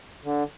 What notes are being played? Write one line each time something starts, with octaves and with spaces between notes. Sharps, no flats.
D3